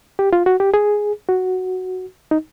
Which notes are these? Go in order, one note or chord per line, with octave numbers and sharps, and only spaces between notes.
G4
F4
F#4
G4
G#4
F#4
D#4